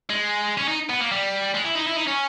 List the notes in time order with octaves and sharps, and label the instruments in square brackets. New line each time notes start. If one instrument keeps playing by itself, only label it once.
[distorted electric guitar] G#3
C#4
D#4
B3
A#3
G3
G#3
E4
D#4
E4
D#4
C#4